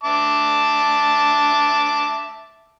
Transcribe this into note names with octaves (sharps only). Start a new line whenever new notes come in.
E5 A5 D6